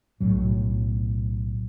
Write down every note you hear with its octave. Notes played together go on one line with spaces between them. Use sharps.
B1 A2 F#3